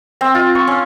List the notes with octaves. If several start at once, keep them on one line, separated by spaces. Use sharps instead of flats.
C4
F4
C#6
C#4